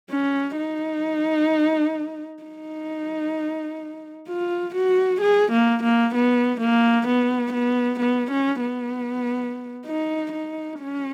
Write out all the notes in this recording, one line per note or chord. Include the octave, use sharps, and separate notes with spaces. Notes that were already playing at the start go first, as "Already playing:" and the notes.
C#4
D#4
D#4
F4
F#4
G#4
A#3
A#3
B3
A#3
B3
B3
B3
C#4
B3
D#4
D#4
C#4